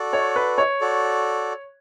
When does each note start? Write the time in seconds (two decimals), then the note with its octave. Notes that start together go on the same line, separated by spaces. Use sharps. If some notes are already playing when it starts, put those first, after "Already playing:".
Already playing: F#4 A4 D5
0.13 C#5
0.36 B4
0.58 C#5
0.80 F#4 A4 D5